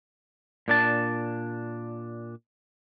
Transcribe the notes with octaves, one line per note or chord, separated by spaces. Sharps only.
A#2 D4 A5